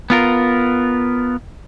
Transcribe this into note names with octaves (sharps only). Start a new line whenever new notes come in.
B3 F4 A#4